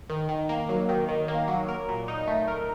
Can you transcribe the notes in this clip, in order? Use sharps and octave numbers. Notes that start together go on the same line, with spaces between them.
D#3
D#3
A#3
F#3
D#3
D#3
A#3
F#3
A#4
A#2
D#4
A3
A#4